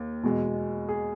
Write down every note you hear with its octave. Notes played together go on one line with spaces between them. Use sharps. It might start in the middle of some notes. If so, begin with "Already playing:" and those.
Already playing: D#2
E2 B2 G#3
G#4